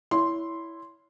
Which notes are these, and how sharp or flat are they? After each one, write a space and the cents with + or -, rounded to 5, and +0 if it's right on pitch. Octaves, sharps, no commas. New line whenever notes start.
E4 +0 C#5 +30 C6 +0